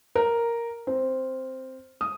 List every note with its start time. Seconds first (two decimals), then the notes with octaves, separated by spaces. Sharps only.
0.15 A#4
0.87 C4
2.01 D#6